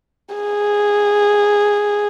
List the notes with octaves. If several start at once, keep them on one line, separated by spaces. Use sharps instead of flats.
G#4